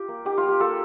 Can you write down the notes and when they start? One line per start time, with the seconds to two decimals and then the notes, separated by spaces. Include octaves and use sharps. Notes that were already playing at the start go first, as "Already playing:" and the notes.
Already playing: F4 G4
0.08 A#3
0.25 D#4 G4
0.38 F4
0.43 A#3
0.48 G4
0.60 A#3 F4 A4